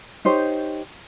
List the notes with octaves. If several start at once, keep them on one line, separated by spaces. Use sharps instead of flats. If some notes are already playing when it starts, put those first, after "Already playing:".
D#4 G4 C5 C#5